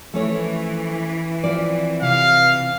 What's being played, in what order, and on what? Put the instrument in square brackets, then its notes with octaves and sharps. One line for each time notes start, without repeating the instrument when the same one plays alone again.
[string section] E3 [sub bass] F3 [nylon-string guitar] A3 C#4 C#5
[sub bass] F3 [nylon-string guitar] C4 F4 D5
[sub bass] C3 [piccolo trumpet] F5